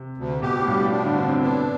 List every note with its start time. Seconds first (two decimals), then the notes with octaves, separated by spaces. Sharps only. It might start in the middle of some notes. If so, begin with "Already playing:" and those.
Already playing: C3
0.17 D2
0.42 B2 G4
0.59 A2
0.67 G2 G3
0.79 A2
0.92 B2 D4
1.04 D3
1.17 A2 C4
1.29 C4
1.42 B3 D4